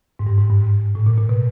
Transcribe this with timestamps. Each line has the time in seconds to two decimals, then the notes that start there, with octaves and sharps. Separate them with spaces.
0.19 G#2
0.27 G2
0.38 G#2
0.50 G2
0.61 G#2
0.95 A2
1.06 A#2
1.17 A#2
1.29 B2